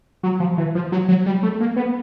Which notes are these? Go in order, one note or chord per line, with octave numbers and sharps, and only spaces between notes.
F#3
F3
E3
F3
F#3
F#3
G3
A3
A#3
B3